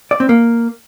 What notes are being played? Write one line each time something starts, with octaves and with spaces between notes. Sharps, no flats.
D5
C4
A#3